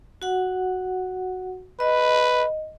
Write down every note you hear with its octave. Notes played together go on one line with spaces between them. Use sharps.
F#4 F#5
B4 D#5